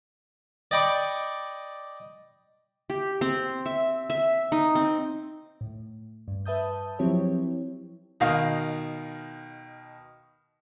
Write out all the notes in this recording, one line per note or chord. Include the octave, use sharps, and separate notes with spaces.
D5 D#5 G5 B5 C#6 D6
G4
C4
E5
E5
D#4
C4
A2
G2
B4 E5 A5 D#6 G6
F3 F#3 C4 E4 G4 C#5
B2 D#3 D#5 F5